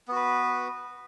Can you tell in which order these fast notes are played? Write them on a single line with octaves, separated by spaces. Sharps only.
B3 F#4 B4